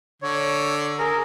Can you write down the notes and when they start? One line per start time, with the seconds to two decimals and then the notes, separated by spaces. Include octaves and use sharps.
0.22 D3 C#5
0.99 G#4 A#4